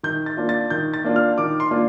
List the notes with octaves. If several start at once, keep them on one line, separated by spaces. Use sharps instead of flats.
D#3 G6
A6
A#3 D4 F4
A6
D#3 G6
A6
A#3 D4 F4
F6
D#3 D6
C6
A#3 D4 F4